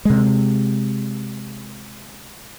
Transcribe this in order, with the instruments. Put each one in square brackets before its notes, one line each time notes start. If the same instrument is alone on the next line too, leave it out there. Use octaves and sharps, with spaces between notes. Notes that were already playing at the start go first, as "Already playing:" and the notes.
[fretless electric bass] C3 G#3